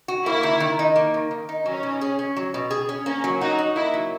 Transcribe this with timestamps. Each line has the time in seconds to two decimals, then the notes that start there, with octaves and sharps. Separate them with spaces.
0.08 F#4
0.26 A#3 E4
0.43 D#3
0.60 D#3
0.79 D#4
0.96 A#3
1.14 D#3
1.31 D#3
1.49 D#4
1.66 F#3 C#4
1.83 B2
2.01 G#4
2.19 C#4
2.36 F#3
2.54 B2
2.71 G#4
2.89 C#4
3.06 A#3 C#4
3.24 F#3
3.41 D#4 F#4
3.59 D#4
3.76 A#3 E4
3.94 F#3